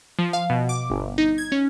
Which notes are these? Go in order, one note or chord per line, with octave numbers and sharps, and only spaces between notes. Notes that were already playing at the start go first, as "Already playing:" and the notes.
F3
F5
B2
D6
G1
D#4
G#6
C#4